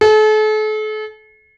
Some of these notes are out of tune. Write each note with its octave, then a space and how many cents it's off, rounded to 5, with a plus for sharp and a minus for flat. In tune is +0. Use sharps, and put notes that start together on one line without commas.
A4 -40